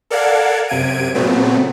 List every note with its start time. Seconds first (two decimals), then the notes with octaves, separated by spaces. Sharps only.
0.10 A4 A#4 D5 F5 F#5 G#6
0.68 F#2 C3 G#6 D7 D#7
1.14 A#2 C#3 F#3 A3 B3 C4